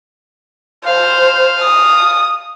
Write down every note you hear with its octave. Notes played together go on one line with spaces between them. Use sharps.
C5 F5
D#6